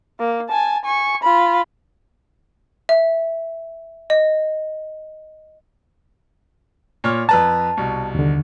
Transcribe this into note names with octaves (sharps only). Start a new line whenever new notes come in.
A#3
G#5 A5
G#5 C#6
F4 B5
E5
D#5
A#2 C#5 F6
F2 B4 A5 A#5
C2 B2
D#2 D3